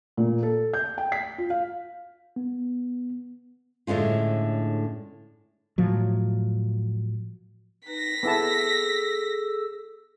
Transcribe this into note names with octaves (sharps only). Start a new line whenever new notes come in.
A#2
A4
G6
G5
B6
F4
F5
B3
A2 D3 G#3 C#4 F4
A2 F3 F#3
D#4 B4 A#6 B6
B3 E4 G#4 A4 A5 E6